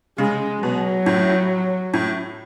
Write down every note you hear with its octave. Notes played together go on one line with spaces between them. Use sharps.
C#3 G#3
B2 F#3
A2
A2